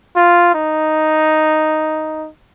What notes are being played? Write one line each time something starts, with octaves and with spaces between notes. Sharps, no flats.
F4
D#4